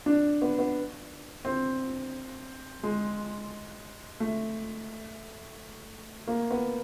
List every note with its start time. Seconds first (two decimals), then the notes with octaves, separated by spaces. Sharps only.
0.06 D4
0.42 B3
0.58 B3
1.45 C4
2.83 G#3
4.20 A3
6.28 A#3
6.51 B3